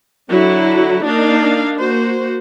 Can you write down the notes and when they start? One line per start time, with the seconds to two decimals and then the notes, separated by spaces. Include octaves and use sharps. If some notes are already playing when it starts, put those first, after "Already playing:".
0.30 D3 F#3 E4
1.06 A#3 D4 D#4 F5
1.78 A#3 F#4 C5